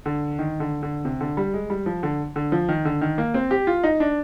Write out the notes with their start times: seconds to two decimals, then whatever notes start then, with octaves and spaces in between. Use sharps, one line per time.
0.06 D3
0.39 D#3
0.60 D3
0.83 D3
1.05 C3
1.21 D3
1.37 G3
1.54 G#3
1.70 G3
1.86 F3
2.03 D3
2.36 D3
2.52 F3
2.69 D#3
2.85 D3
3.01 D#3
3.18 A#3
3.34 C4
3.51 G4
3.67 F4
3.84 D#4
4.00 D4